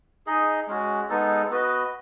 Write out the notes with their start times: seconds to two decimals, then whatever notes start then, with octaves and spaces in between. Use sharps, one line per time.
0.26 D#4 G#4 D#5
0.67 G#3 C#4 F#4
1.09 G#3 B3 D#4 A4
1.50 B3 F#4 B4 D#5